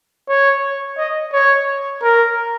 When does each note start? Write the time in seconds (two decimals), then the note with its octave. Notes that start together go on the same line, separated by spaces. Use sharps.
0.29 C#5
0.97 D#5
1.33 C#5
2.02 A#4